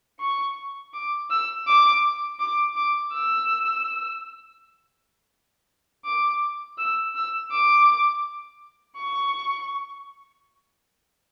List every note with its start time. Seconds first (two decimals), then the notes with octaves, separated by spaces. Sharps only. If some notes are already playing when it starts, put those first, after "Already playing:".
0.20 C#6
0.94 D6
1.30 E6
1.67 D6
2.40 D6
2.76 D6
3.13 E6
6.05 D6
6.78 E6
7.15 E6
7.51 D6
8.97 C#6